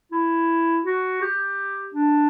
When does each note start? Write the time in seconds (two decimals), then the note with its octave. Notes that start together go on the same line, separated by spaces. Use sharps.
0.12 E4
0.85 F#4
1.22 G4
1.94 D4